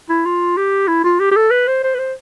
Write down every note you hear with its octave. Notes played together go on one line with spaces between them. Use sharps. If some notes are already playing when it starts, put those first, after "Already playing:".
E4
F4
G4
E4
F4
G4
G4
A4
B4
C5
C5
B4
C5